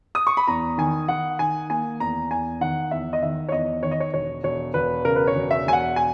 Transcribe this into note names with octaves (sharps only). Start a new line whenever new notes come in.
D#6
C#6
B5
E2 A#5
D#3 G#5
D#3 F#5
D#3 G#5
A#3 G#5
E2 A#5
E2 G#5
D#3 F#5
E2 E5
D#5
D#3 E5
C#5
E2 D#5
D#3 C#5
D#5
C#5
E1 C#5
E1 C#5
E1 B4
C#3 A#4
B4
C#5
E1
E5
E1 G#5
F#5
G#5